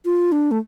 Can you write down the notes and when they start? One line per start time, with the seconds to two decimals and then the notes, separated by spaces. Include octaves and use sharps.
0.05 F4
0.32 D4
0.51 A3